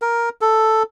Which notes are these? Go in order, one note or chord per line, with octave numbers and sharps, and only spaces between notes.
A#4
A4